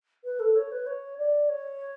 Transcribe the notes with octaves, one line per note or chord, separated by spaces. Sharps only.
B4
A4
C#5
B4
C#5
D5
C#5